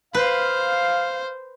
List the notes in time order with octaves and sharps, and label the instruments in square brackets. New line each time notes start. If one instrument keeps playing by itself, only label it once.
[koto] B4 [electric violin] C5 [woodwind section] F5